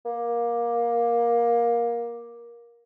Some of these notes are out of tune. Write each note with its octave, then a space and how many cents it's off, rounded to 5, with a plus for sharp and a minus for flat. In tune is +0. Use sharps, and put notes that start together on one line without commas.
A#3 +15